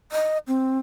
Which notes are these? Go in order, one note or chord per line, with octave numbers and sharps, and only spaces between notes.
D#5
C4